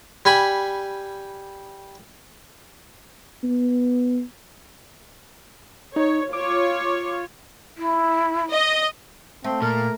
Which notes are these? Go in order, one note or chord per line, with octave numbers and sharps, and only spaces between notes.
G3 G#5 B5
B3
D#4 C#5
F4 C#5 D6
E4
D#5
A3 C4
A#2 A#4